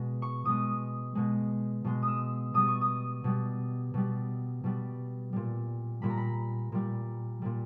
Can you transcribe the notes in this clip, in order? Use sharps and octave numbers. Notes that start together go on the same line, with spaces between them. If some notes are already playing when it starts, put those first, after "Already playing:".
Already playing: B2 G#3
C#6
B2 G#3 D#6
B2 G#3
B2 G#3
D#6
E6
B2 G3 D#6
C#6
D#6
B2 G3
B2 G3
B2 G3
A#2 G3
A#2 G3 B5
A#5
B5
A#2 G3
A#2 G3